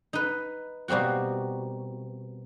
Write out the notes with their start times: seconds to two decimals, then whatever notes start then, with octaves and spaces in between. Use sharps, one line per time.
0.13 D#4 B4
0.88 B2 G3 A#3 C4 F#4